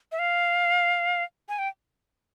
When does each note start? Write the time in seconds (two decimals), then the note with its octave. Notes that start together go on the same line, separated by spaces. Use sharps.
0.12 E5
0.19 F5
1.49 G#5
1.59 G5